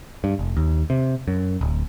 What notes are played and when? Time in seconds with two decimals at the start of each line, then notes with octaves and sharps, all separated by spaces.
0.24 G2
0.39 F1
0.57 D#2
0.90 C3
1.28 F#2
1.61 D1